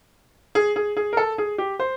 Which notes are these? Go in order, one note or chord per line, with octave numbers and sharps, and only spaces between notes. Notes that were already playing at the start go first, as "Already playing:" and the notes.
G#4
G#4
G#4
A#4
A4
G#4
G4
C5